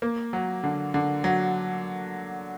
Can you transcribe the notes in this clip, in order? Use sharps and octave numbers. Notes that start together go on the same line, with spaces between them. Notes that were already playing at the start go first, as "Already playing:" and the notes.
A#3
F#3
D3
D3
F#3